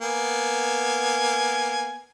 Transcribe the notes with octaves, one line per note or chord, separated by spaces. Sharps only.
A#3 B3 G#5